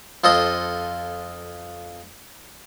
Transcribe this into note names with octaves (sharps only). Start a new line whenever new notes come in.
F2 F4 A4 C5 D#5 D#6